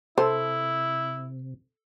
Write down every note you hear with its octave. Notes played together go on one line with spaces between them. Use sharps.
C3 E4 A4 C5